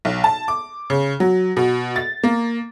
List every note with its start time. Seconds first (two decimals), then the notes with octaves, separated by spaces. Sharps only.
0.05 B1
0.24 A5
0.48 D6
0.90 C#3
1.20 F#3
1.57 B2
1.96 A6
2.24 A#3